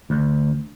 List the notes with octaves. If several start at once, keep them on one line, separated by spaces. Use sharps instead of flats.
D2